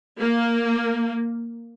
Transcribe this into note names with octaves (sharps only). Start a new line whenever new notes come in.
A#3